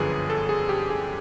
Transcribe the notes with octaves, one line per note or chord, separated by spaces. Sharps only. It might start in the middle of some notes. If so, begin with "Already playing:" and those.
Already playing: G1 F#2 D3 F3 G#4 B4
A4
G#4
G4
G#4